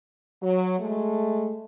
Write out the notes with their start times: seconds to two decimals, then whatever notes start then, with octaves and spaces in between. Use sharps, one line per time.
0.42 F#3
0.80 G#3 A3